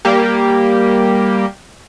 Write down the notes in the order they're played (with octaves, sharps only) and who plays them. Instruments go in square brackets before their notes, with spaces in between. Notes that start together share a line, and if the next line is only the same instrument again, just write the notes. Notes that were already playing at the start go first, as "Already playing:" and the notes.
[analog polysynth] G3 A#3 G4